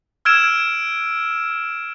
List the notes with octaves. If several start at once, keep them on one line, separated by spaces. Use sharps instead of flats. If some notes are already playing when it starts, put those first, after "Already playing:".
E6 F6 G#6 D7 E7